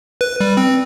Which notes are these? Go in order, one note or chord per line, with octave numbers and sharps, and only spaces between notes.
B4
G3
C4